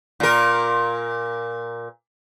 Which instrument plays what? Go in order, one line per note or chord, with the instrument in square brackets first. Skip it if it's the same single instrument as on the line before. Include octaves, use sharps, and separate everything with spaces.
[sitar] A#2 A#4